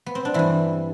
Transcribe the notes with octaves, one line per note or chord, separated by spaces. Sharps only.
B3
C4
D4
G2 E3 E4